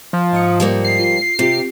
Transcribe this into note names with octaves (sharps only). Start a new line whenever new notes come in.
F3
G#2 D#6 C#7
F3 G3 A#3
C7
F4
C3 C4 F4 G4